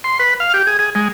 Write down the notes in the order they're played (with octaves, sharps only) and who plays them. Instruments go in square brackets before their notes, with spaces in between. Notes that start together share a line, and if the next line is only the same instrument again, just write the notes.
[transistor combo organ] C6
B4
F5
G4
G#4
G#4
G#3